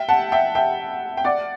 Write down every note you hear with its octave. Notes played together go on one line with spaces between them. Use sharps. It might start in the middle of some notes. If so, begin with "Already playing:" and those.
Already playing: E5 G5
F#5 A5
E5 G5
E5 G5
G5
D5 F#5